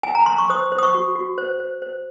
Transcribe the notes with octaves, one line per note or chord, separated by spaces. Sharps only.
G#5
A#5
C6
C#6
C5 D#6
C5
D#6
C#6
F#4
F#4
C5
C5
C5